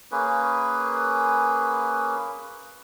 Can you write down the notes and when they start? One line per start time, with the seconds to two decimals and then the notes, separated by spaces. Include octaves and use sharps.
0.12 A#3 C#4 G#4 B4